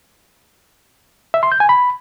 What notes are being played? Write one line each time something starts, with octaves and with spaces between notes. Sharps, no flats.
E5
C6
G6
G#5
B5